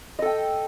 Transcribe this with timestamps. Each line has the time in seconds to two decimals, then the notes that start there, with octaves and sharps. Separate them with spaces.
0.19 D#5
0.22 A4
0.26 G5